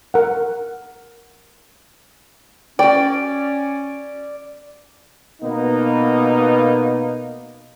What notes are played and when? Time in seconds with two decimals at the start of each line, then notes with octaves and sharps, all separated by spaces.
0.14 A#4 F#5
2.79 C#4 F#4 D5 G5
5.42 B2 A#3 B3 D#4